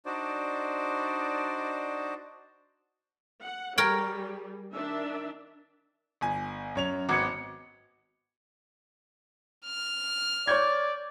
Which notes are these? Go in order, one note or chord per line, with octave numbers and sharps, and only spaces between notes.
D4 D#4 F#4 C5 D5
F#5
G3 G#4 A#4 C#5 G5
D#3 D4 E5
G1 G#5
F#2 C#5 F7
G#1 B3 F#4 D6 G#6 C#7
F6
C#5 D5 G6 G#6